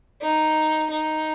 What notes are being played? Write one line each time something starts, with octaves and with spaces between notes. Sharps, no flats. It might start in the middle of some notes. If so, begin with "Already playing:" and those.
D#4
D#4